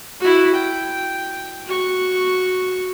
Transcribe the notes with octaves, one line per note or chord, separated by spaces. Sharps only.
E4 F#4
G5
F#4 C#6